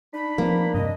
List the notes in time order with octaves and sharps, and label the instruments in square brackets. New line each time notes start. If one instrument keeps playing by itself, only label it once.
[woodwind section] D4 D#4 B5
[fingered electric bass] F3 C4 [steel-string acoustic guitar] A#3
[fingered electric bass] G2 C3 [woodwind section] D4 D#5